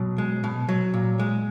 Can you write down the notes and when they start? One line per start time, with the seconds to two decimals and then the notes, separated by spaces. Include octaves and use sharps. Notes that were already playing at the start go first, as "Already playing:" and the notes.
Already playing: B2 F#3
0.18 G#3
0.44 B2
0.69 F#3
0.94 A#2
1.19 G#3